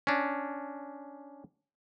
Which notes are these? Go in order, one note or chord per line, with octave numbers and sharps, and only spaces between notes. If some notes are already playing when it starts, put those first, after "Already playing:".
C#4 D4